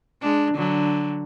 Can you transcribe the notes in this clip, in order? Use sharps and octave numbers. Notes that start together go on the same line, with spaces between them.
G#3 D4
D3 F#3